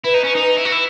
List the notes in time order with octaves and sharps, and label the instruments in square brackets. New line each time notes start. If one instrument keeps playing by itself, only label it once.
[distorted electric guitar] E4 [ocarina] B4
[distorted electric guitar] D#4
C#4
D#4
E4
F#4
E4